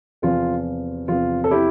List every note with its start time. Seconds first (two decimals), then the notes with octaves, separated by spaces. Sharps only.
0.22 E2 C3 F3 F4
1.08 E2 C3 F3 F4
1.44 A4
1.51 E4 G4